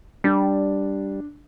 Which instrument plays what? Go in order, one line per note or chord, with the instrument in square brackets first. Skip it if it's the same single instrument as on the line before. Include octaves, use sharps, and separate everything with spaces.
[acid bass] G3 [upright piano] D4